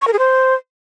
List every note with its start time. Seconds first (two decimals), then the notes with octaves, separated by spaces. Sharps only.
0.02 C#6
0.07 A#4
0.13 G#4
0.19 C5